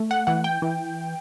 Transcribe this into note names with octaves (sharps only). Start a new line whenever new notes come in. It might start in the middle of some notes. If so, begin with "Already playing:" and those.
Already playing: A3
F#5
E3 F#5
G5
E3